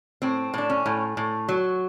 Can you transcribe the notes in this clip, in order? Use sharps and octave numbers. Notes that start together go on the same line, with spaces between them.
A2 C4
A2 D4
C#4
A2
A2
F#3